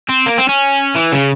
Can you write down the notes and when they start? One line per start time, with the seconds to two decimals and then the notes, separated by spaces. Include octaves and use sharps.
0.09 C4
0.26 A#3
0.38 C4
0.49 C#4
0.95 E3
1.12 C#3